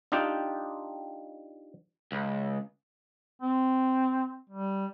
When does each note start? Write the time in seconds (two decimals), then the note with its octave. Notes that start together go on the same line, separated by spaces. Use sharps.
0.12 D4 D#4 F4 G4 G5
2.12 C#2
3.42 C4
4.50 G3